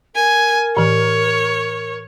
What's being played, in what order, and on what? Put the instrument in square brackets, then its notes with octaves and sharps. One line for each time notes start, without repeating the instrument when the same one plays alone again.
[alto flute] A#4 [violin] G#5
[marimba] A2 E3 [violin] C#5